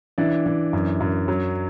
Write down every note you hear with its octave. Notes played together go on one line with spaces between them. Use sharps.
E3 D4 D5
E3
F#2
F#2
F#3